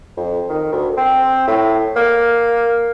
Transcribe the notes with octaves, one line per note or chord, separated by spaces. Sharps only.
F2
D#3
D2
C4
A2
A#3